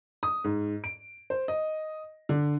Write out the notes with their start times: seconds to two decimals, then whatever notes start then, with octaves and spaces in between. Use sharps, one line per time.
0.23 D#6
0.44 G#2
0.84 D7
1.30 C5
1.48 D#5
2.29 D3